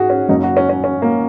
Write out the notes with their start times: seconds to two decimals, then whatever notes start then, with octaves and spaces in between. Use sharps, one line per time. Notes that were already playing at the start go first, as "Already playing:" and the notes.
Already playing: G#2 F#4 G#4
0.10 C#4
0.29 F#1 F#2 F#3 A#3 D#4
0.43 F#4
0.57 C#4
0.69 C#4
0.84 C#4
1.02 A#3